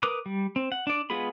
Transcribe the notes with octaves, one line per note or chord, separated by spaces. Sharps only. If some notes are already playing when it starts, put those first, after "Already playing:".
A#4 B4 D6 D#6 F#6
G3
C4
F#5
D4 D5
G#3 B3 F4 G#4 B5